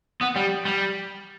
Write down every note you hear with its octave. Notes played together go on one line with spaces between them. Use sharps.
B3
G3
G3